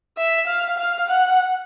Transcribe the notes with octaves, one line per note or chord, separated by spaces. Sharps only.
E5
F5
F5
F#5